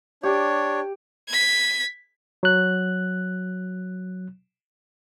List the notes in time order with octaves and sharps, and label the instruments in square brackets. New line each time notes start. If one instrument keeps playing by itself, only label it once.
[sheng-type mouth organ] D4 C#5 [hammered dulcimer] G4
[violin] G#6 B6
[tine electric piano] F#3 F#6